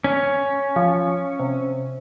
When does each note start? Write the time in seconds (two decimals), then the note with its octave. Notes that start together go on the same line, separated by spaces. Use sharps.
0.04 C#4
0.76 F3
1.39 C3